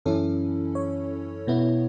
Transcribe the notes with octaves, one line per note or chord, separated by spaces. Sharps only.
F#2 E3 C#4 E4 A4
C#5
B2 B3 E4